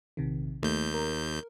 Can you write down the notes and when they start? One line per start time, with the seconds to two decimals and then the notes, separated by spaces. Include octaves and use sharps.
0.17 A#1 C3 D#3
0.63 D#2 A3 G6
0.94 A#4